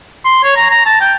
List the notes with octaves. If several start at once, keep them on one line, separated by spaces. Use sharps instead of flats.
C6
C#5
A#5
A#5
A5
G5